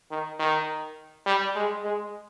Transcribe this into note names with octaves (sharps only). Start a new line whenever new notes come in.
D#3
D#3
G3
G#3
G#3